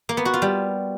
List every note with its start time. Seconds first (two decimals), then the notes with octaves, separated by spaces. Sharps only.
0.09 A#3
0.17 B3
0.25 F#4
0.34 F4
0.42 G3